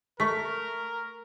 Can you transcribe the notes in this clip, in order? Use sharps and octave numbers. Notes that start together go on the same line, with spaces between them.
A3 A#4 C#6 B6